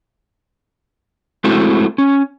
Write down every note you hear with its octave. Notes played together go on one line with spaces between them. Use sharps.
G#3 A3 C4 E4 F#4
C#4